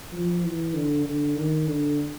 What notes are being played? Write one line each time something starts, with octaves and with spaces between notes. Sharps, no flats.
F3
E3
D3
D3
D#3
D3